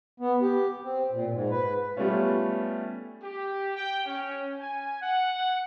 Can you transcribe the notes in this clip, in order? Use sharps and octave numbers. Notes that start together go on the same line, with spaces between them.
B3
G4
C4
A#2
G#2
B4
G3 A3 B3 C#4 F4
G4
G5
C#4
G#5
F#5